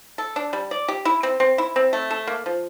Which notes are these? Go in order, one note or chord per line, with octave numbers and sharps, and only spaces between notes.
A4
D4
G3
D5
G4
E4
C4
C4
E4
C4
A3
A4
A#3
F3